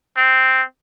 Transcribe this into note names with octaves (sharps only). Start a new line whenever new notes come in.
C4